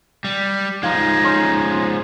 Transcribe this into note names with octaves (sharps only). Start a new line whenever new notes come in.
G3
F3 G#3 D#4 F4
C#4 C5